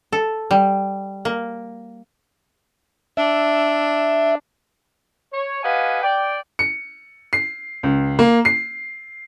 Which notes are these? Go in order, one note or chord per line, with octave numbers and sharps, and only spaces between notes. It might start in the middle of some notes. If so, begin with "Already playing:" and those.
A4
G3
A#3
D4 E5
C#5
G4 B4 D#5 F5 F#5 G#5
D5 G5
C#7
C7
C#2
A#3
C7